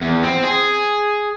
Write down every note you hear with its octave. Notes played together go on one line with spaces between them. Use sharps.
E2
C4
G#4